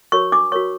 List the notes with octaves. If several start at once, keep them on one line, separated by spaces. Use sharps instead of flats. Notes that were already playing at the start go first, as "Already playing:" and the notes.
F#4 A#4 C#5 C#6
D4 D6
F#4 A#4 C#5 C#6